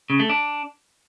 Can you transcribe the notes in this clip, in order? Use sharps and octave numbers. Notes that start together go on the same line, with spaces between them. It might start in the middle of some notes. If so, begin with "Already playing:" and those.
C#3
A3
D4